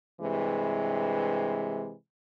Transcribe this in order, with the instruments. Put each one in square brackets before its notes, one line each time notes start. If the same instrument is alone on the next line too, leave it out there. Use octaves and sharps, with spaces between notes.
[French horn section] G2 C3 E3 G#3